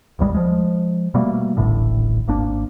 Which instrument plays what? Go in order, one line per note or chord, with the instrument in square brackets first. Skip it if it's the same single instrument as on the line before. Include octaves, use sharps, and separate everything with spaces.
[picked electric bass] A1 D#2 G3 G#3
F3 G#3
B2 G3 A3 A#3
D#1 A1 A2 D3
G#1 A#3 D4